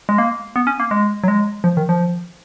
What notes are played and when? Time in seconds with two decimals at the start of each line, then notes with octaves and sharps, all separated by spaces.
0.09 G#3
0.18 A#3
0.56 B3
0.67 C#4
0.80 A#3
0.91 G#3
1.24 F#3
1.28 G#3
1.64 F3
1.77 D#3
1.89 F3